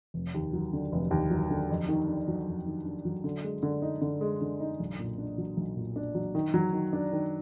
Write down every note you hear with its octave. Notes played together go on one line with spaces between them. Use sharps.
F1
D#2
F#3
D3
F1
D#2
F#3
D3
F2
D#3
D4
F#3
F2
D#3
D4
F#3
D3
G#3
D3
D#4
D3
G#3
D3
D#4
B1
A#2
D4
F#3
B1
A#2
D4
F#3
D#3
F#3
D#3
D4
D#3